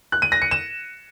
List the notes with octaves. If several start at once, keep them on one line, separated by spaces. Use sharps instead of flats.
F#6
D#7
A#6
C#7
E7